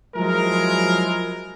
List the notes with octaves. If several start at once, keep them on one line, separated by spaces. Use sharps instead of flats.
F3 F#3 G#3 E4 G#4 A#4